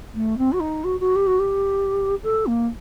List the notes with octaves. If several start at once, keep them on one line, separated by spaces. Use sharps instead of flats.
A3
C4
F#4
D#4
F#4
F#4
G4
F#4
G4
A4
A#3